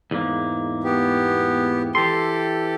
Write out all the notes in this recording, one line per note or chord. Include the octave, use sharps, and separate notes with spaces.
E2 G#2 A#3
B3 G4
E3 G4 A4 C6